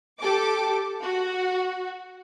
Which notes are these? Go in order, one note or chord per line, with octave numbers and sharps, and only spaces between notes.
G4 A4 D6
F#4